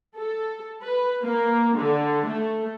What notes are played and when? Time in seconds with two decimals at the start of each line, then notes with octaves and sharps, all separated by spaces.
0.18 A4
0.82 B4
1.23 A#3
1.76 D3
2.27 A3